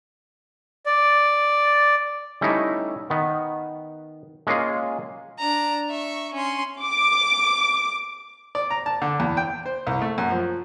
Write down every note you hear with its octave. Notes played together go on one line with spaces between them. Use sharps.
D5
G3 A3 C#4 D#4 E4
D#3 B3
G#3 A#3 C#4 F4 G#4
D4 A#5
E5 C#6
C#4 C6
D6
D5
A#5
A5
D3
E2
G5
C5
C2
A3
F#2
F3